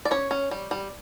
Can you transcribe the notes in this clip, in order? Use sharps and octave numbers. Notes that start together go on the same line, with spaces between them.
D5
C#4 C#5
C#4
G3
G3